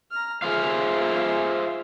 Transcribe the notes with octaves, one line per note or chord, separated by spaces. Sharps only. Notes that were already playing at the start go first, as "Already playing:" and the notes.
A#5 F6
F4 G#4 C5 E5 F5